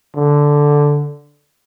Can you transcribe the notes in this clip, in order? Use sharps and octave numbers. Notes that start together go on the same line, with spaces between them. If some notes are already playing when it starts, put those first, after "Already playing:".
D3